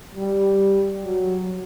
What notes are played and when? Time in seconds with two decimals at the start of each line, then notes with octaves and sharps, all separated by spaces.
0.15 G3
1.03 F#3